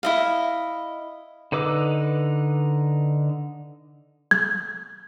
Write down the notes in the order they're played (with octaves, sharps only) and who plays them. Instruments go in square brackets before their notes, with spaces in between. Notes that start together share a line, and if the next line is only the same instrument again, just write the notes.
[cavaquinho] E4 D#5 F5
[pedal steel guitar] D3 D#4 B4 D6 E6
[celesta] G#6